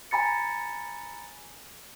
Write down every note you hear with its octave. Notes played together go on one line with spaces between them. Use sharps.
G#5 A#5 B5 A6 C#7